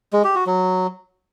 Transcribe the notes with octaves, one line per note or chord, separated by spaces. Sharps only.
G#3
G4
F#4
F#3